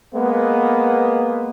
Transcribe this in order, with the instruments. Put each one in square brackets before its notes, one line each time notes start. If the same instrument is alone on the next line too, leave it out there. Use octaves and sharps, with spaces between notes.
[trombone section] G#3 A#3 B3